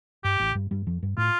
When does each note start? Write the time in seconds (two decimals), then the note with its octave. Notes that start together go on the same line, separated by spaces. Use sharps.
0.24 G2 G4
0.40 A1 A2
0.55 G2 G3
0.71 G2 G3
0.86 F2 F3
1.03 G2 G3
1.17 A2 A3 F4